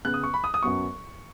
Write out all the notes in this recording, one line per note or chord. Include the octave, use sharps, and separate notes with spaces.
C#3 B3 F#6
D#6
C#6
B5
D#6
D#6
F#2 F#3 B3 C#6